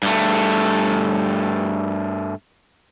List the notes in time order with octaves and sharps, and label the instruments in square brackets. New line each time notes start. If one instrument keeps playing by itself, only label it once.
[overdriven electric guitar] G2 A3